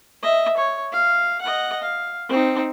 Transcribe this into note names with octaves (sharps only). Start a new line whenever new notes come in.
D#5 E5
C#5
F5
D#5 F#5
F5
C4 D#4